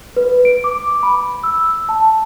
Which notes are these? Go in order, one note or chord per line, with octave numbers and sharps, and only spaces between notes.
B4
D7
D6
B5
E6
A5